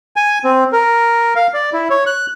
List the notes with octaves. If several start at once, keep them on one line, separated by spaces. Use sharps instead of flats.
G#5
C4
A#4
F5
D5
E4
C#5
F#6